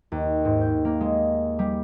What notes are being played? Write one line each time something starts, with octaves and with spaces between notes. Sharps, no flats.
D#2
G#2
G6
A#3
G#3
G3